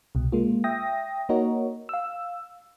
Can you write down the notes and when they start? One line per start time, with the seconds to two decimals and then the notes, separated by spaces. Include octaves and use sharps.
0.15 C2 B2
0.32 G#3 A#3 F4
0.64 E5 G5 D#6 A#6
1.29 A#3 D#4 F#4 A#4 C#5 D#5
1.89 F5 E6